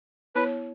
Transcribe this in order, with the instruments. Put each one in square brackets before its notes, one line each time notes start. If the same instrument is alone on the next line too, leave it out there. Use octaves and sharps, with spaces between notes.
[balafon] B3 E4 C#5 [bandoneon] B4